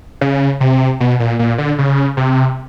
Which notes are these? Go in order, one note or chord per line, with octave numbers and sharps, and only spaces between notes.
C#3
C3
B2
A#2
A#2
D3
C#3
C3